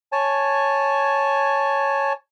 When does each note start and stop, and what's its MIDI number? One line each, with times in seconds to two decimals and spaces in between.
0.12 2.13 73
0.12 2.13 80
0.12 2.13 81